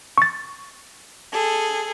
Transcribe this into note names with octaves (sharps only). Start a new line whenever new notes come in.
C#6 A6
G#4 A4